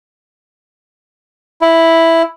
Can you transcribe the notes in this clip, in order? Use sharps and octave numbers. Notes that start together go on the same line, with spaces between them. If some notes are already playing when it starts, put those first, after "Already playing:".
E4